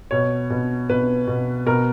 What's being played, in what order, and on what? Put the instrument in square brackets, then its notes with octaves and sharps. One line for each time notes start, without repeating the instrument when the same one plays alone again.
[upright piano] B2 C#5
B2
B2 B4
B2
B2 A#4